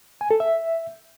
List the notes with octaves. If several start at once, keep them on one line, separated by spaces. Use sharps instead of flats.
G#5
A4
E5